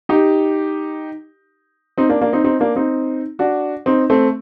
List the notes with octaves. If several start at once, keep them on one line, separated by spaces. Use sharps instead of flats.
D#4 G4
C4 D#4
A#3 D4
A#3 D4
C4 D#4
C4 D#4
A#3 D4
C4 D#4
D4 F#4
C4 D#4
A3 C4